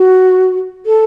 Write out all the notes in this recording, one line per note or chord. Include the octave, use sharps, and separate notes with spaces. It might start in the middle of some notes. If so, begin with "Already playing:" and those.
Already playing: F#4
A4